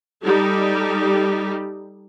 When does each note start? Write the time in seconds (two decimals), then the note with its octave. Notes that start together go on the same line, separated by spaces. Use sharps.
0.24 G3 D#4 G4 A4